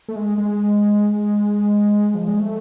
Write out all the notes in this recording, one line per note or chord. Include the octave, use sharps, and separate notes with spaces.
A3
G#3
G#3
F3
G#3
A3